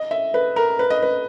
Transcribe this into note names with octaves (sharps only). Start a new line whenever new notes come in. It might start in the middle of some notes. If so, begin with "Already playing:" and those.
Already playing: D#5
E5
B4
A#4
B4
D#5
B4